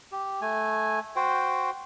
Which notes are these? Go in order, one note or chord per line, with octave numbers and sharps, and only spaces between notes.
G4
A3 G#5
F#4 C5 G5